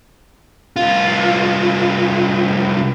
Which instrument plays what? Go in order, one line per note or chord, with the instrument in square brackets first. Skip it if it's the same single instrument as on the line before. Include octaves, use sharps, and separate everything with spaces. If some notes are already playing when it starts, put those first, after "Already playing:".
[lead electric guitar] C2 F4